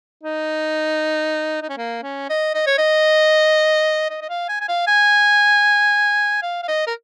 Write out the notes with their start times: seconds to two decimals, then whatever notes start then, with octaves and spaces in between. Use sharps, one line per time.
0.23 D#4
1.62 D#4
1.69 C#4
1.78 A#3
2.03 C#4
2.30 D#5
2.55 D#5
2.67 C#5
2.78 D#5
4.10 D#5
4.21 D#5
4.30 F5
4.49 G#5
4.61 G#5
4.68 F5
4.87 G#5
6.42 F5
6.63 F5
6.68 D#5
6.87 A#4